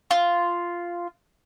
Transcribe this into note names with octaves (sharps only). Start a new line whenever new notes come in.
F4